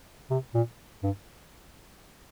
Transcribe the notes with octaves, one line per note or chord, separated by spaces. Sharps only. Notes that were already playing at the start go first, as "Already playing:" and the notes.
C3
A#2
G2